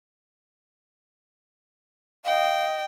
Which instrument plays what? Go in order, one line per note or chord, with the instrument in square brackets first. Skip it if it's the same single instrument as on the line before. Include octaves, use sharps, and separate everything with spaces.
[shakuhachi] D#5 [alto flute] F5 [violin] G5